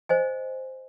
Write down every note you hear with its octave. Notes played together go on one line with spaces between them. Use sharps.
C5 D#5 G#5